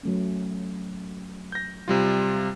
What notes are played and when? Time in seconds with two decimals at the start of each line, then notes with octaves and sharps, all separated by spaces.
0.03 F#3 A3 C#4
1.52 G6 A#6
1.88 C3 G3 F4